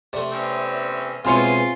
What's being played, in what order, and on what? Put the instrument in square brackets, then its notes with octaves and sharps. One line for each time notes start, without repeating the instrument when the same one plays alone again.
[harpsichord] C3 A3 [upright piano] D5
[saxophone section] E2 C4 C#4
[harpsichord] C#2 B2 E4 [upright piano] C4 C6 C#7 [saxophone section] F4 [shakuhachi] G#5